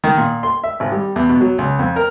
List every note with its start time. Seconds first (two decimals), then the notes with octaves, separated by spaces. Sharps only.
0.04 D#3
0.18 A#2
0.43 C6
0.64 E5
0.80 G#1
0.92 G3
1.16 E2
1.29 B2
1.41 F#3
1.58 C#2
1.79 F2
1.96 A#4